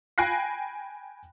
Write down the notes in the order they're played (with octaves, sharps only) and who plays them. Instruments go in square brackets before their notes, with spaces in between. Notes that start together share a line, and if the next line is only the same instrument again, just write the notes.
[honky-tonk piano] G5 G#5 B5 F#6 A#6 C7